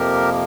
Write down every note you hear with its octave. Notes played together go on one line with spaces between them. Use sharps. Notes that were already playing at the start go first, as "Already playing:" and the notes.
Already playing: F2 C3 F3 A#3 G4 A#4